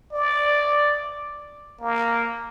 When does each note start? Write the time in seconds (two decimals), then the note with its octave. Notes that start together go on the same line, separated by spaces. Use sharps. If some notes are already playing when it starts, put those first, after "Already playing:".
0.13 D5
1.81 A#3